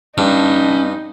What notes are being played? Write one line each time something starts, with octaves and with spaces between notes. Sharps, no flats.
G2 C#4 D#4 A5